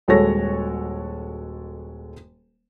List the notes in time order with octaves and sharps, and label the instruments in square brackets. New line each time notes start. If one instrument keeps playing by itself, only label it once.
[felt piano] D#1 G#3 F#4 A4 C#5 A#6